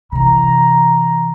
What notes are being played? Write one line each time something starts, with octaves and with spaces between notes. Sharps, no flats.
C3 E3 A#5